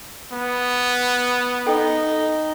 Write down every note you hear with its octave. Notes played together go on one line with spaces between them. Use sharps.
B3
D#4 A4 G5